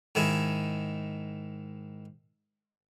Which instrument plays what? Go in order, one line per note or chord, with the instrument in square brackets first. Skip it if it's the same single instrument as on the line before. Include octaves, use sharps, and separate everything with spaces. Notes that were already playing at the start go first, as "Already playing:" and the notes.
[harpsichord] G#2 D#3 E4 G#4